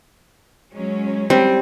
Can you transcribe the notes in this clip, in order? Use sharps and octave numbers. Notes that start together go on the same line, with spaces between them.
F#3 G#3 C#4
G3 C4